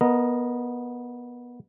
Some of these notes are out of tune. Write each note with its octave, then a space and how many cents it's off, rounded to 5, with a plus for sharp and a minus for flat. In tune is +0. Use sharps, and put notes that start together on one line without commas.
B3 -20 A#4 +0 D#5 +0